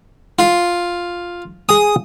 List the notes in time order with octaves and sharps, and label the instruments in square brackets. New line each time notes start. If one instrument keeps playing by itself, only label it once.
[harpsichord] F4
[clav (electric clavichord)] G#4 G#5 [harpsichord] D#6